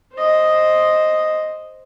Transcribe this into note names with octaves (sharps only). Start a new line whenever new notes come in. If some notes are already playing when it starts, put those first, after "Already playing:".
C5 D#5